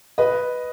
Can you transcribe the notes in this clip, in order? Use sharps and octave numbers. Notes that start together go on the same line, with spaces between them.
B4 D#5